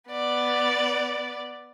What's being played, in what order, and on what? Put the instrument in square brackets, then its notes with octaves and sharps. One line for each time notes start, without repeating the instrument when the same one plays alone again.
[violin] B3 D5